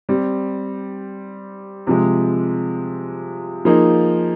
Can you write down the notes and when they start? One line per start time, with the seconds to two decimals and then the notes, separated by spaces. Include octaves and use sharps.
0.09 G3 C4 G4
1.87 C3 F3 G#3
3.65 F3 A#3 D#4 G#4